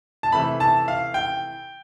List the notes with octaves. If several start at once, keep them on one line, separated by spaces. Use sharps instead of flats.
A5
C3 E3 A3 B5
A5
F5
G5